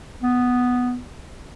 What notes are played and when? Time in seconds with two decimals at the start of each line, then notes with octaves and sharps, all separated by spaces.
0.23 B3